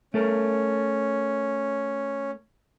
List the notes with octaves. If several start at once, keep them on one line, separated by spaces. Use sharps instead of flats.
A3 C#4 A4 A#4